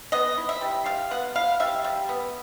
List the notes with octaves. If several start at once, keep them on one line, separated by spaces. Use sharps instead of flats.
B3 D#5
E4
E5
G3
G3 F5
B3 F#5
E4 F5
G3 E5
G3
B3